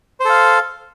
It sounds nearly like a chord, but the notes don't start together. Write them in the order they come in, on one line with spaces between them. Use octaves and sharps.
C5 A4 F5